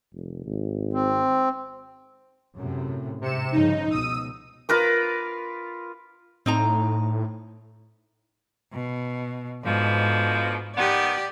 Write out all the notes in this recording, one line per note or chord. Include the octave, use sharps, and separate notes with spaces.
F1
G#1
C4
F#2 A2 C3
G#2 C3 C#7 E7
G2 C#3 F3 D#4
C#2 B2 D#6 E6 D#7
F4 A#4 B4 D6
A2 C4 D#4 A#5
B2
G#2 B2 D3 F3
D#3 B3 G4 D5